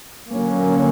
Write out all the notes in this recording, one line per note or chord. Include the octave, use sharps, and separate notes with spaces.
D3 F#3 A#3 C#4